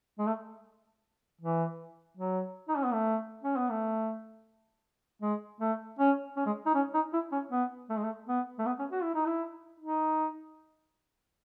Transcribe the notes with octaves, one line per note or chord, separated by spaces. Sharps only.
G#3
A3
E3
F#3
D#4
C#4
B3
A3
C#4
B3
A3
G#3
A3
C#4
C#4
G#3
D#4
C#4
D#4
E4
C#4
B3
A3
G#3
A3
B3
A3
B3
C#4
F#4
E4
D#4
E4
D#4